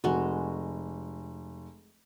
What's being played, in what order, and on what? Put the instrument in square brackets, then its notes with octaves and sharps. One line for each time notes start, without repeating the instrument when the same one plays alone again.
[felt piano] F1 [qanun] G#3 F#4